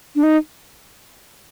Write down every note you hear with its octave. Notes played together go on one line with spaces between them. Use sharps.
D4
D#4